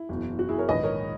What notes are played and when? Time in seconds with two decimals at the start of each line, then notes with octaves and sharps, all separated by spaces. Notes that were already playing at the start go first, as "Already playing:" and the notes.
Already playing: E4
0.09 F#1 E2 B2
0.39 F#4
0.49 E4 G#4
0.58 A#4 C#5
0.68 A#1 G#2 D#3 B4 D#5
0.83 A#4 C#5